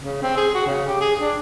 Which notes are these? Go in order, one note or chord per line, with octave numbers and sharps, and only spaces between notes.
C#3
C4
G#4
F#4
C#3
G4
G#4
D4